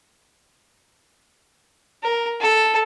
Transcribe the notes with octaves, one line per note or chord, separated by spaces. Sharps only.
A#4
A4